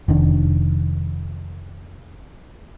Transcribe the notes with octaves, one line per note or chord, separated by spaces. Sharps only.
F1 D#3 D4